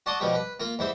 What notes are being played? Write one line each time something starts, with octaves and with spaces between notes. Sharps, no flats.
F#4 D5 A5 C6 D#6
B2 F3 G3 G4
B4
A#3 F4
E2 G3 C5 E5